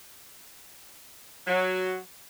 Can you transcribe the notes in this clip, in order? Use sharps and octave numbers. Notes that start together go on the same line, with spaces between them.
F#3